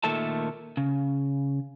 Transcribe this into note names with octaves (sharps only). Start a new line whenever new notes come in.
A#2 D#3 A3 A4 E5 A5
C#3